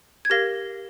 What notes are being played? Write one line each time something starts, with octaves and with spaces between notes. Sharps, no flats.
G#6
G4 A#4 F5 A#6